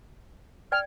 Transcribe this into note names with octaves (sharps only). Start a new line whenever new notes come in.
D5 G5 G#5 F6